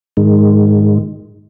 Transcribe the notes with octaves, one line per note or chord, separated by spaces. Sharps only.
G#2 D#3 G#3